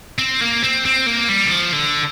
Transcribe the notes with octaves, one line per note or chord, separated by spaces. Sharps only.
C4
A#3
C4
C4
A#3
G3
D3
F3
D3